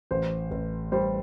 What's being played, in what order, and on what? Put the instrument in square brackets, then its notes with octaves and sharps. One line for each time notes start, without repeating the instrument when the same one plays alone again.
[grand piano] A1 [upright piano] C5
[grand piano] A1
[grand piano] G3 [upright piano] C5